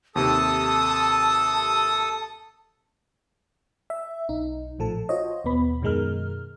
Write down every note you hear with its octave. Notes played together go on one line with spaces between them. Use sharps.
D#2 C3 A4 A5 D#6
E5
B1 D#4
A#1 A2 F3 A4 A5
F4 F#4 C5 C#5 D#5
D#2 B2 B3 B5
F#2 B2 D#3 G#3 A#4 F6